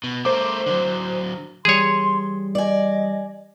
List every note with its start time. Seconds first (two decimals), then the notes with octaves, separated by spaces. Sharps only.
0.04 B2
0.25 A3 A#4 C5 D6
0.66 D3 F#3
1.65 E3 G3 G#4 C#5 C6
2.55 D5 D#5 G#5